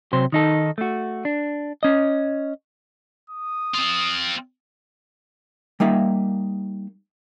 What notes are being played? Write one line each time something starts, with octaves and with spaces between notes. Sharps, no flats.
C3 F#3 C5
D#3 D#4 A4
A3 F#4
D4
C#4 D#5
D#6
C4 F4
G3 A#3 D#4 E5